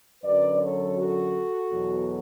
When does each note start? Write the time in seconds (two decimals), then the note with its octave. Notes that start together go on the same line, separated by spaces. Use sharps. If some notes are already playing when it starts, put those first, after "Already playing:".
0.23 F#2 D3 F#3 B4 D5
0.61 A4 C#5
0.97 F#4 A4
1.71 E2 B2 F#3